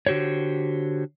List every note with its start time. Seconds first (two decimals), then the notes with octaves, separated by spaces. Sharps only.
0.07 D3 F#4 G4 C5 C#5